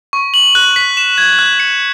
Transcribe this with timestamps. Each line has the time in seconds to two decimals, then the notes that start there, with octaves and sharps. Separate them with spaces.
0.13 C#6
0.34 F#7
0.55 F#6
0.76 B6
0.97 E7
1.18 G#6
1.39 F#6
1.60 C#7